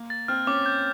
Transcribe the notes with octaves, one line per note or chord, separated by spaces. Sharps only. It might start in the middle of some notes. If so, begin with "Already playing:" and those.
Already playing: A#3
A6
C4 F6
C#4 D6
G6